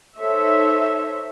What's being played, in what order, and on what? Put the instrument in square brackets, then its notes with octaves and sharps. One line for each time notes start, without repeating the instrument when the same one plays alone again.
[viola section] D#4 A4 C5 C#5 E5